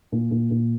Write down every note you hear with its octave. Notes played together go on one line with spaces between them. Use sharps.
A#2
A#2
A#2